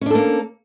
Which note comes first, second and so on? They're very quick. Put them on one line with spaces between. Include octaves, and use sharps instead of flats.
C#4 D4 A4 A#3